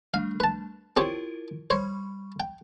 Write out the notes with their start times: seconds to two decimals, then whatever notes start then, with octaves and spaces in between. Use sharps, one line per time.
0.14 G3 A3 D4 F5
0.40 B4 A5
0.97 C4 E4 F4 G4 A#4 C#5
1.70 G3 C5 C#5 B5 C#6
2.40 G5